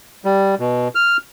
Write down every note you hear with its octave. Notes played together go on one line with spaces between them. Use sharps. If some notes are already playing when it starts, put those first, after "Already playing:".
G3
B2
F6